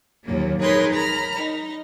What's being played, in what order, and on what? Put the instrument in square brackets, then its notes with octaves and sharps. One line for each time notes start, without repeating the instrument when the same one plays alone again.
[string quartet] D#2 A#2 F3 F#3 A#3
D#4 G#4 A#4 B4 C#5 C6
A#5 B5 F6
D#4